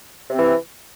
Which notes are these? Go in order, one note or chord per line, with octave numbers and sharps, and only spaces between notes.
C3 E3 C4